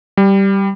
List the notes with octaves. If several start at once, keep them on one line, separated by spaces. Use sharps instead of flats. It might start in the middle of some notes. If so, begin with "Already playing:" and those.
G3